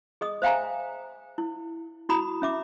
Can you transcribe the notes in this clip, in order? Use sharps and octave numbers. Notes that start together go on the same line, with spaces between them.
G#4 D#5 D#6
C5 E5 F5 G5 G#5 A#5
E4
E4 F#4 A#5 B5 D#6
C#4 E5 D6